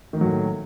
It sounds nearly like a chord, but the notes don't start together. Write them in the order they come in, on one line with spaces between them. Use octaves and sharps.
D#3 A#3 F#3 A2